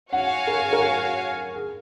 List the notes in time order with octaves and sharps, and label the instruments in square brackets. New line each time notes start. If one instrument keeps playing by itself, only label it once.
[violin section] F#4 C#5 F5 G#5 [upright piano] F#5
[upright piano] A#4
G#4
A#4
G#4